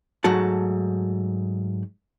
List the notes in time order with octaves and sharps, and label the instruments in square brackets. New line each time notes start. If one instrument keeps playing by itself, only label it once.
[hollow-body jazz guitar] G#2 F#3 A3 F#4 A5